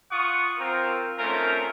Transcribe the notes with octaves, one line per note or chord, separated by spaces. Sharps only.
F4 F#5 C#6 D#6
C4 F4 A#4
A3 C4 C#4 D#4 F4 A#4